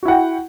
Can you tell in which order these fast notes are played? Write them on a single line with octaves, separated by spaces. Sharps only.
F#4 E4 F#5 G5